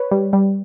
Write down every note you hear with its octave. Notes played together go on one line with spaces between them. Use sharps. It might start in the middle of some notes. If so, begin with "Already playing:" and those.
Already playing: B4 C#5
G3
G3